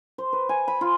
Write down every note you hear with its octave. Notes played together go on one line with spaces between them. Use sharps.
C5
B4
G#5
B5
F4